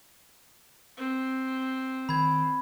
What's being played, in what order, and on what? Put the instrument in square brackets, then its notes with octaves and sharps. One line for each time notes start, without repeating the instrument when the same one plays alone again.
[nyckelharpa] C4
[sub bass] D#3 [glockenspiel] B5 G#6